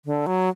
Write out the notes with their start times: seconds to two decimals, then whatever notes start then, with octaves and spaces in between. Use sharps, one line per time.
0.05 D3
0.26 F#3